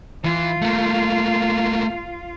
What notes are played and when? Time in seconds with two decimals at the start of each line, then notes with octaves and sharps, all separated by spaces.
0.24 E3 F4
0.62 A3 A#3